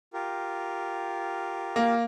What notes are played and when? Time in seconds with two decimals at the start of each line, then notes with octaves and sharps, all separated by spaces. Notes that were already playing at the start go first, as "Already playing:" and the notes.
0.13 F4 G4 A#4
1.76 A#3